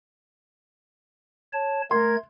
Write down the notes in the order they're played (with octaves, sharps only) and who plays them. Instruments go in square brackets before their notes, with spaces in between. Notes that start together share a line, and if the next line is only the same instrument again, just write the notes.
[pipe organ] C#5 A5
[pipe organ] A3 G#6 [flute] A#4 [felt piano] C6